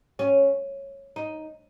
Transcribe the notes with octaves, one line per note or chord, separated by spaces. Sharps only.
C#4
D#4